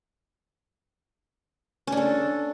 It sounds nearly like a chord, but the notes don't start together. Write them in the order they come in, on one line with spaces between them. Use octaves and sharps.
C#4 D4 A4